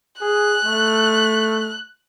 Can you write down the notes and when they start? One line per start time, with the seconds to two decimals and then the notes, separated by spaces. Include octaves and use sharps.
0.21 G#4 F#6
0.65 A3